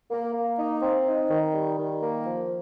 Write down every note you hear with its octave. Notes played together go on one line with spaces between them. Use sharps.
A#3
A#3
D#4
C4
D#4
D#3
G3
D#3
A#3
F3